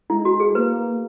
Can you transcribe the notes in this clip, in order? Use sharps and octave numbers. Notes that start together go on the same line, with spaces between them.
G#3 E4
F#4
G#4
A#3 B4